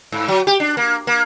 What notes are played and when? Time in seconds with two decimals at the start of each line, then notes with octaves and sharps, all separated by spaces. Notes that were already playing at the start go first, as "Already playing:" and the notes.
0.12 G#2
0.28 F#3
0.47 G4
0.60 D4
0.77 A#3
1.07 A#3